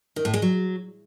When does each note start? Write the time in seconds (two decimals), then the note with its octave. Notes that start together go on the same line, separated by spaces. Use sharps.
0.16 D#3
0.25 A2
0.34 G#3
0.42 F#3